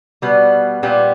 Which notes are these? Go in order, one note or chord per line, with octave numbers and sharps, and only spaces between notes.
B2 G3 B3
A#2 G3 B3 G4